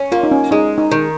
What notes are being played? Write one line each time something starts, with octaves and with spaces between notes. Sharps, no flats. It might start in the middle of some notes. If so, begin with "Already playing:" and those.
Already playing: C#4
A#3 F4
D#4
C#4
G#3 D#4
D#4
D#3